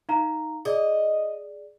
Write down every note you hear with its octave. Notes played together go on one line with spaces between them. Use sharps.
D#4 F5 A#5
G#4 D5 D#5